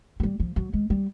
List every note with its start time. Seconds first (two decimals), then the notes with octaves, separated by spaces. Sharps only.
0.20 F#3
0.23 G3
0.40 F3
0.56 F#3
0.73 G#3
0.90 G3